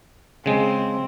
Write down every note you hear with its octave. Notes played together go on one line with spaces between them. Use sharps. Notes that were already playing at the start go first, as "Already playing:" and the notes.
C#3 G#3 C4